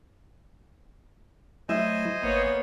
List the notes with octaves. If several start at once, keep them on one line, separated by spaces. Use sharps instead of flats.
F#3 A3 E4 C5 D#5 E5 G#5
G#1 A#3 B3 C#5